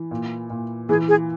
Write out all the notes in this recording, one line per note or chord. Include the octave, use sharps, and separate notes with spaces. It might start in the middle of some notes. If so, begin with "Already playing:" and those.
Already playing: E3
A#2
A#2
E3 G#4
G#4